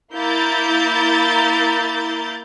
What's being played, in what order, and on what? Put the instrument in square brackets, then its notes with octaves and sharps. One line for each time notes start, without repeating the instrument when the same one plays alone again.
[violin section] A#3 E4 A#4 G6 A6